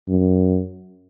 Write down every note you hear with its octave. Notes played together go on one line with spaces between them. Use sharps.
F#2